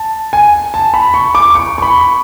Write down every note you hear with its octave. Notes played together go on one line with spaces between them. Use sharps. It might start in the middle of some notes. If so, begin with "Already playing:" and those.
Already playing: A5
G#5
A5
B5
C#6
D6
C#6
C#6
B5